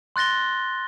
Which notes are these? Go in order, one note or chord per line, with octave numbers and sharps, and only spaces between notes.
C6 F#6 A6 A#6 G7